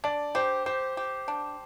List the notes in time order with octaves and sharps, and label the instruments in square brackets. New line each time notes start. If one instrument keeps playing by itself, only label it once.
[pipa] D4 [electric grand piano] D5
[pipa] G4 [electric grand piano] C5
[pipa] G4 [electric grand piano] C5
[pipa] G4
D4